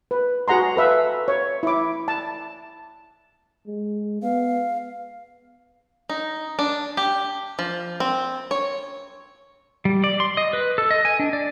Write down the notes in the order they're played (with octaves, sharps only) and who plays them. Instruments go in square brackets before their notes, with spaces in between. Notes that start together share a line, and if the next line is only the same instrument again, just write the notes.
[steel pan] B4
F#4 G#4 F#5 A#5 C6
A4 B4 E5 F5
C#5
E4 D6
A5
[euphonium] G#3
[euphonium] B3 [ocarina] F5
[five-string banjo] D#4
D4
G4
F3
C4
C#5
[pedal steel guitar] G3
D5
C6
D#5
B4
A4
D#5
G#5
D4
D5